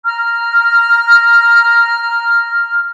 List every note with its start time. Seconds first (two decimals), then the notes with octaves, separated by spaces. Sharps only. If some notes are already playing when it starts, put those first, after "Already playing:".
0.05 A#5 F6